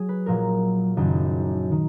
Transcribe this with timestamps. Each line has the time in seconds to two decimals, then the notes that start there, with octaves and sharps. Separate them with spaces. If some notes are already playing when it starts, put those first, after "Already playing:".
Already playing: F#3 G#4
0.09 B4
0.26 A#1 A#2 F#3 A#4
0.97 F#1 F#2 D#3
1.71 D#3